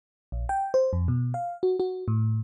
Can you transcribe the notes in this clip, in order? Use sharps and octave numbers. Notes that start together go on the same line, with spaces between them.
A#1
G5
C5
F2
B2
F5
F#4
F#4
A2